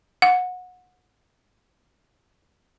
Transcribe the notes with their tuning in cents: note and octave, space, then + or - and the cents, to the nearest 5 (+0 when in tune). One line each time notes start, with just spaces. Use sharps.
F#5 -25